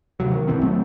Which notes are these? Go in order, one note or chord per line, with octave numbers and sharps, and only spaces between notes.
D2 C3 F#3
D#3
B1 B2 E3 C4
B2 F#3 A3 C4